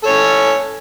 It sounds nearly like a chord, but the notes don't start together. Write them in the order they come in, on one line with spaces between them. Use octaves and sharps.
A4 C#5 C#4